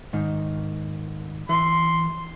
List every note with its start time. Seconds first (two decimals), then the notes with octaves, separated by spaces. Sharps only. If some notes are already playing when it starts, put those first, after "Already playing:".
0.13 G#2 D#3
1.49 E3 C6